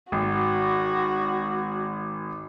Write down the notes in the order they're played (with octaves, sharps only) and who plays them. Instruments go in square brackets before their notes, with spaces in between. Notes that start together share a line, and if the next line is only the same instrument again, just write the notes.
[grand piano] G#1 [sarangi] F#4